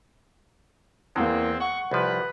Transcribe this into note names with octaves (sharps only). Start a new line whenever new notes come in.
E2 G#3 A#3 C4
F#5 C#6
C2 F3 B4